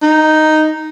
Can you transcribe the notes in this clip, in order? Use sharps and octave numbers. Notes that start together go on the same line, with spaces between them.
D#4